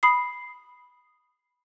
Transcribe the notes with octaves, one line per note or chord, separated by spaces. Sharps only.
B5 D#6 C7